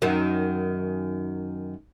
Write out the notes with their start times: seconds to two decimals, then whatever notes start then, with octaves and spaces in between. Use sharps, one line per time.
0.02 F#2 D#3